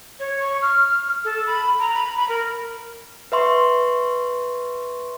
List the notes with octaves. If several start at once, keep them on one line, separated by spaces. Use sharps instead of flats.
C#5
C#6
F6
A4
B5
A#5
B5
B5
A#4
B4 E5 C6 C#6